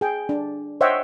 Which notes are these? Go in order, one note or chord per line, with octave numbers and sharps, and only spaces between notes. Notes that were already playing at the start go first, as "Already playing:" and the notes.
G#4 G5
D4
C5 C#5 D#5 E5 F#5 G5